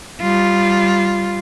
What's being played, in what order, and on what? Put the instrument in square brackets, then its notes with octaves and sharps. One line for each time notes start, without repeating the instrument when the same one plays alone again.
[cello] G3 F4